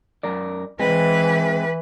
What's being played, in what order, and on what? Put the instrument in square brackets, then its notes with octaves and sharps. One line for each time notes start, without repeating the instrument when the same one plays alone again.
[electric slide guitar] F#2 A#4 D5
[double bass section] E3 [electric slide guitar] G#3 C4 [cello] B4